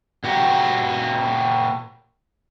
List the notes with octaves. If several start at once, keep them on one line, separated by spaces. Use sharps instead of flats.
A#2 F#4 G4